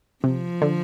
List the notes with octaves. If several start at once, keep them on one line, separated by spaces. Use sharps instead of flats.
C3 F3
D3